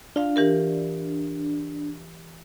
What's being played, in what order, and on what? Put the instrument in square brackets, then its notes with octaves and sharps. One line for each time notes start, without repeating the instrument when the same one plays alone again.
[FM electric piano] D4 [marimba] F4 F5
[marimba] E3 G4 A#4